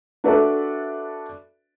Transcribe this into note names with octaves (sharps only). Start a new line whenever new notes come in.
D4 F#4 A4 B4 D5 E5